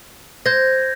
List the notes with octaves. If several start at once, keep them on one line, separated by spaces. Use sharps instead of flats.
C5 G6 G#6 A#6